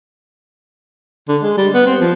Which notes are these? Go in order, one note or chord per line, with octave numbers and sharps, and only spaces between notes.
D3
G#3
G3
B3
C4
F3